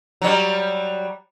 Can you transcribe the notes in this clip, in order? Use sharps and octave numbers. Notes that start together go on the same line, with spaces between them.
F#3 G3